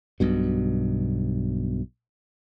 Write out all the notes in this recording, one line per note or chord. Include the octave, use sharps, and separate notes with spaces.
B1 G2 B2